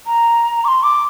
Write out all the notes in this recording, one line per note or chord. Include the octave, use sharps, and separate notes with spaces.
A#5
D6
C6
D6